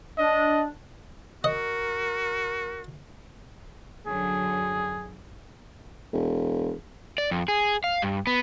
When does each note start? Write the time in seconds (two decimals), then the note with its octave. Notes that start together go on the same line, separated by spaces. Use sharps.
0.18 D4 D#5
1.44 F#4 A#4 D#5
4.06 F#2 D3 F#3 G#4
6.13 E1
7.18 D5
7.31 F2
7.48 G#4
7.84 F5
8.02 G2
8.27 B3